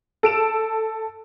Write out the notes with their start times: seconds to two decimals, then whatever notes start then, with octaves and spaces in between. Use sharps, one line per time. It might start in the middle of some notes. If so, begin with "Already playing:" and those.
0.23 A4 D7 E7